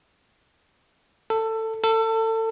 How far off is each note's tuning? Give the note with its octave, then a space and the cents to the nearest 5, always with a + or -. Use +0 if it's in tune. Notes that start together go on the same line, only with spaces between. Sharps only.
A4 +20
A4 +30